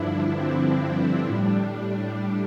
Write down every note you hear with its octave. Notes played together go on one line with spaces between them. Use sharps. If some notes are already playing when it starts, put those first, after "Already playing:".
Already playing: G2 D3 F3 D4 E4
C4
D4
A2 G3
D4